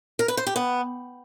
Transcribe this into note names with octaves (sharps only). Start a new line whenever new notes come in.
A#4
B4
C5
G4
B3